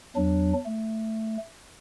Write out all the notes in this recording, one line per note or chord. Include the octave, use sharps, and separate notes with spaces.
E2 F#3 D4
A3